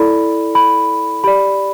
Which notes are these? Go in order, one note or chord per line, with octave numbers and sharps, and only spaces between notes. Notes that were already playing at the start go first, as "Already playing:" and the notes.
Already playing: E4 A4 D5 B5
B5
G4 D5 B5